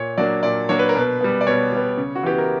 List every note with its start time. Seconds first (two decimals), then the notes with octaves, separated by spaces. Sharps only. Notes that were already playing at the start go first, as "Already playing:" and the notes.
Already playing: A#2 C#5
0.18 F#3 A#3 D4 D5
0.43 A#2 D5
0.69 F#3 A#3 D4 C#5
0.79 B4
0.89 A#4
0.95 B2 B4
1.21 G3 B3
1.41 D5
1.47 B2 C#5
1.72 G3 B3
1.97 C#3
2.15 F#4
2.23 E3 B3 G4
2.38 A#4